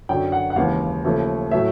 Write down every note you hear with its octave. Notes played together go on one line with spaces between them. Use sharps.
F#2 D3 F#3 G5
F#5
F#5
D#2 C#3 E3 G#3 F5
D#2 C#3 F3 A3
A2 F#3 A3 E5